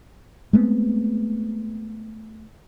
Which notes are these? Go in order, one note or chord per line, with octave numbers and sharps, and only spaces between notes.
G#3 A3 B3 C4